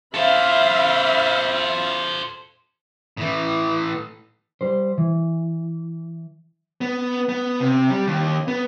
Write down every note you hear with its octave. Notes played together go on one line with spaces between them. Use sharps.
A4 C5 E5 F5 B5
A2 E3
G3 C5
E3
B3
B3
C3
G3
D#2
B3